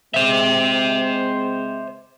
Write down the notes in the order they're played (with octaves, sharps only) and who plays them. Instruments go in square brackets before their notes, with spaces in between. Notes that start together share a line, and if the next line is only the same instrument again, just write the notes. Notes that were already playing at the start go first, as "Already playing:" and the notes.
[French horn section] G#3 C4 [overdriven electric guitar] C5 E5